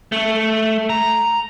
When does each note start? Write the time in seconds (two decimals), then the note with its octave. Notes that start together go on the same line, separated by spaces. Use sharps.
0.12 A3
0.90 A#5